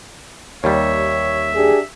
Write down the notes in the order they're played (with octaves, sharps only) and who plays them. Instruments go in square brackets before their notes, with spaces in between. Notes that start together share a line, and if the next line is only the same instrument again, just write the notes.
[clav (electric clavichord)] D#2 G3 [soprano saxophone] C#5 [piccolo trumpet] E5
[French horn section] D4 G4 G#4